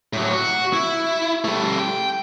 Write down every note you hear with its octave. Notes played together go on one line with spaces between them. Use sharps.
A2 F#3
F#4
E4
G3 A3
G5